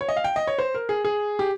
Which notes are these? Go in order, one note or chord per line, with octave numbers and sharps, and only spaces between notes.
C#5
D#5
F5
G5
D#5
C#5
C5
A#4
G#4
G#4
G4